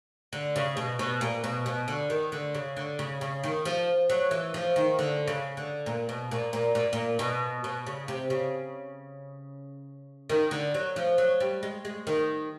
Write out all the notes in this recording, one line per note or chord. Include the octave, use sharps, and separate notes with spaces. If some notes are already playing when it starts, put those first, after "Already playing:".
D3
C#3
B2
B2
A#2
B2
B2
D3
D#3
D3
C#3
D3
C#3
C#3
D#3
F3
F#3
E3
F3
D#3
D3
C#3
D3
A#2
B2
A#2
A#2
A#2
A#2
B2
B2
C#3
C3
C#3
D#3
D3
F#3
F3
F#3
G3
G#3
G#3
D#3